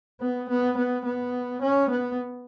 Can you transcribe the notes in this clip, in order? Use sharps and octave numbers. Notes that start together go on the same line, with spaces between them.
B3
B3
B3
B3
C#4
B3